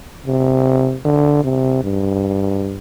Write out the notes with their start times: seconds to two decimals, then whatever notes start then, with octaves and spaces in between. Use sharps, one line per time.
0.26 C3
1.05 D3
1.44 C3
1.83 G2